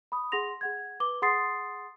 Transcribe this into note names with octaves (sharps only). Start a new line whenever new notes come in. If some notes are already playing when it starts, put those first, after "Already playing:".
B5 D#6
G#4 F#5 C6 A#6 F7
G#4 F#5 G#6
B4 D6 G7
G#4 F#5 C6 D#6 A6 C7